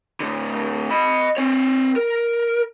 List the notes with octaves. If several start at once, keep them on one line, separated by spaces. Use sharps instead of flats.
A2 D3
D#5 B5
C4 C#5
A#4